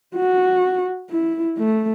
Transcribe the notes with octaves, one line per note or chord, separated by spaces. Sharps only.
F#4
E4
A3